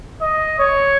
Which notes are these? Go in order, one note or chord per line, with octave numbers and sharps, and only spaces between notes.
D#5
C#5